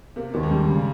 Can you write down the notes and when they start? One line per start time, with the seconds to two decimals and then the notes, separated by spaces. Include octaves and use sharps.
0.16 C3 A#3
0.34 D#2 A#2
0.43 G#2
0.51 G2 G3
0.69 C#3